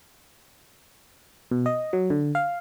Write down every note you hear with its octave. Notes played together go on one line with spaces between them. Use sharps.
B2
D#5
F#3
D3
F5